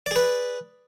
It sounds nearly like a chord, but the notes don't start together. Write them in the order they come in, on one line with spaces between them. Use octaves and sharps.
D5 G#4 B4